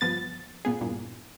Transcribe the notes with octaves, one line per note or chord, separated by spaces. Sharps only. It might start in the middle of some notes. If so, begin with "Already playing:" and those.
G1 F3 B3 A6
A#2 B3 G#4
E2 G2 A#2